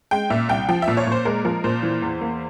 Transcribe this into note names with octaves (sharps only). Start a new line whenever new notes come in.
G#3 G5
A#2 E5
C2 G5
F3 G5
E5
A#2
C#5
A#2 C5
G#3 A#4
F3 A#4
A#2 C5
E3
E2
A#3